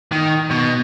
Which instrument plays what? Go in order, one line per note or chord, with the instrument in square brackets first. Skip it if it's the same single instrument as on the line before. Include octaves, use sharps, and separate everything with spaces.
[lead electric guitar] D#3
B2